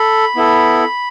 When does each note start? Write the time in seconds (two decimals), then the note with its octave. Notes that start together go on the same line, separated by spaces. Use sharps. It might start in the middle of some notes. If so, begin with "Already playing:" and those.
Already playing: A4 B5
0.36 B3 E4 A4